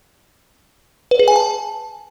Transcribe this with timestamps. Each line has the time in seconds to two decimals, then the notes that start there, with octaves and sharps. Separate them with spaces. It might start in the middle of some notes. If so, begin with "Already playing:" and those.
1.11 B4
1.19 G#4
1.28 G#5
1.36 A5